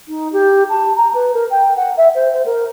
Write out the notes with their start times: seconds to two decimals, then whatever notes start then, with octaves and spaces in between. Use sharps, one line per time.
0.08 D#4
0.32 G4
0.69 A5
0.96 A#5
1.14 B4
1.34 A#4
1.50 G5
1.76 F#5
1.97 E5
2.15 C5
2.33 C5
2.45 A#4